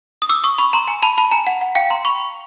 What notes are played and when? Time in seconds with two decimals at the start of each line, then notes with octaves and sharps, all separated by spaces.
0.22 D#6
0.29 D6 E6
0.44 C#6 D#6
0.58 B5 C#6
0.73 A#5 C6
0.87 G#5 A#5
1.02 A5 B5
1.18 A5 B5
1.31 G#5 A#5
1.47 F#5
1.61 F#5
1.75 F5 G5
1.90 A#5 C6
2.05 B5 C#6